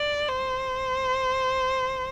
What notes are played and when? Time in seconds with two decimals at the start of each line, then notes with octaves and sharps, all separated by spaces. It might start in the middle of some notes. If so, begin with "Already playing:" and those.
Already playing: D5
0.29 C5